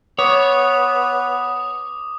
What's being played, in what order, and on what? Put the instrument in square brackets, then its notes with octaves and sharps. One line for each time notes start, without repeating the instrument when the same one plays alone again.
[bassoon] B3 [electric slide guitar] C#5 [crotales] D6 D#6